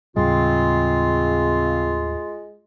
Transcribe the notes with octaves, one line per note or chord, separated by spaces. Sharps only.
D#2 A2 C#3 G3 G#3 C4 F4